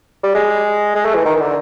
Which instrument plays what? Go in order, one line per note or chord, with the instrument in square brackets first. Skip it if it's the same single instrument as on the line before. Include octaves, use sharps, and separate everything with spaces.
[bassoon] G3
G#3
G#3
A3
E3
D#3
D#3
D3